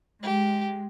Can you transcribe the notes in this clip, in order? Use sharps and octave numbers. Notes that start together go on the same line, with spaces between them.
G#3 G4